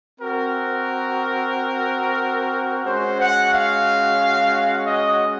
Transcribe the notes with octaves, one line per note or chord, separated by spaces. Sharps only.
C4 F#4 A#4
G#3 C#4 F#4 C5
F#5
F5
D#5